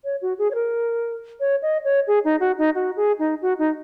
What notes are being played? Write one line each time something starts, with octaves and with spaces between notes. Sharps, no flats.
C#5
F#4
G#4
C#5
A#4
C#5
D#5
C#5
G#4
D#4
F#4
D#4
F#4
G#4
D#4
F#4
D#4